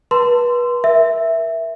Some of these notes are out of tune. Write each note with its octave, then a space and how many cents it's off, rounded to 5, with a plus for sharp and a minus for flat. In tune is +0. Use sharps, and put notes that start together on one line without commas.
B4 -30 A5 +30 C6 -15
A#4 +25 E5 +0